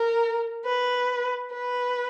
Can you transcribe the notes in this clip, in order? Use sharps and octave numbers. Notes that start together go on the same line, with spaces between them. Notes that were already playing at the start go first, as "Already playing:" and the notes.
Already playing: A#4
B4
B4